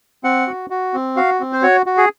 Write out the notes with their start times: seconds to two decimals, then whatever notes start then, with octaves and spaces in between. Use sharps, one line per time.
0.24 C4 F#5
0.47 F#4
0.70 F#4
0.94 C4
1.16 F#4 F5
1.40 C4
1.53 C5
1.62 F#4 C#5
1.86 F#4
1.97 G#4